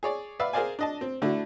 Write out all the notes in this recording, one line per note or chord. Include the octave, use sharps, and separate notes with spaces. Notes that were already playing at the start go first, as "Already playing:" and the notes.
G#4 C#5 D5
B4 D5 E5 F5 B5 E6
G#4 A#4 C5 D5 F5 G#5
D4 D#5 A5
C4
D3 A3 D4 E4 F#4